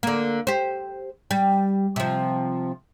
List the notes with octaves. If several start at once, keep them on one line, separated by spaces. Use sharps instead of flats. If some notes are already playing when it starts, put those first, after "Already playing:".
D3 A#3
G4 C5
G3
C3 F3